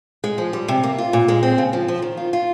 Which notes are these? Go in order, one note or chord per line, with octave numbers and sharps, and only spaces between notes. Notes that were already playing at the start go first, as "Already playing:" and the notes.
G#3
F3
G3
C3
A#3
F4
A#2
G#3
C4
C#3
F3
F3
D#3
F4
F4